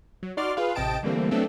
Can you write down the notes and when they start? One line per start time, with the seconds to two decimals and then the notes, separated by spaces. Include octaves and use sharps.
0.23 F#3
0.37 D#4 F#4 D5 C6 D6 F6
0.57 F4 G#4 B4 F5
0.75 A1 C3 D#5 G5 A5 D7
1.03 D3 E3 G3 A3 A#3 C4
1.31 F#3 A3 B3 C4 D4 A4